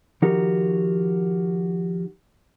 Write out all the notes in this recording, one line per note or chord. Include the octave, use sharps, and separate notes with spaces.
D#3 F3 D#4 F#4 G4 A#4